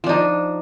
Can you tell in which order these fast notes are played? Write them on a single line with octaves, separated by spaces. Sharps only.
F3 D4 D#4